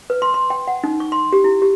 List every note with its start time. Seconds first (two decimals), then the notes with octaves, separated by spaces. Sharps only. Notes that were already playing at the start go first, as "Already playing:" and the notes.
0.10 B4
0.22 C6
0.34 C6
0.50 G5
0.68 F#5
0.84 D#4
1.00 C#6
1.12 C6
1.33 G4
1.44 E4
1.62 G4